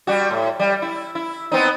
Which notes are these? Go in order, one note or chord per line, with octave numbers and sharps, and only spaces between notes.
G3 F#4
A2
G3
E4
E4
B3 C4 D#4